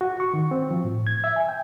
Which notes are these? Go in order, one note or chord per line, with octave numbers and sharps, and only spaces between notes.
F#4
C#6
D#3
C4
F3
A2
G#6
E5
G#5
G5